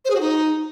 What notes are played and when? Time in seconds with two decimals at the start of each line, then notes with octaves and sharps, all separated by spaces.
0.05 C5
0.10 G#4
0.15 F#4
0.20 D#4